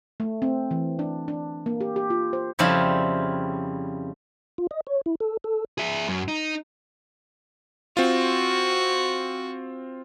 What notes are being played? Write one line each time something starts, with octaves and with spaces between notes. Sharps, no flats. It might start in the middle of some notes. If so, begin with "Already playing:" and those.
A3
C4
E3
D4
D4
A#3
G4
G4
F4
C5
F2 C#3 F3 G3 E4 F4
F4
D#5
C#5
E4
A4
A4
G#4 E5
F#2
D#4
C4 F4 F#4